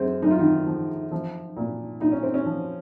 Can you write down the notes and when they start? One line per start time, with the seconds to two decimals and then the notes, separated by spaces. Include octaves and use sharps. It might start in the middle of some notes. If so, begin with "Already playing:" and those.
Already playing: F#2 C4 G#4 C5
0.22 F#2 D#4
0.31 F4
0.39 D#3 D#4
0.66 F3
1.12 F3
1.57 A#2
2.00 A#2 D#4
2.12 C#4
2.23 C4
2.34 C#4
2.46 F3